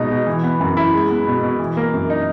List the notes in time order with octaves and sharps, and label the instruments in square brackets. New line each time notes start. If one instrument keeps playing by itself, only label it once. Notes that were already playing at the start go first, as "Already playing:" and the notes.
Already playing: [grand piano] B2 G#3 D#4
B2
E3
B3
F#2
E4
G#3
B3
B2
B2
E3
A#3
F#2
D#4